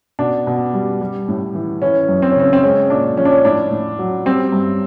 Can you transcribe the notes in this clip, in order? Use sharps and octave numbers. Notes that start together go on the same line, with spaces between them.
B2 D4
B2
G3
G3
A2
E3
E3 C#4
F#2
C4
C#4
C#3 C4
C4
G#3 C#4
A#2 D4
F3 C#4
D4
C#4
A2 D4
A2
F#3
G3 C4
G2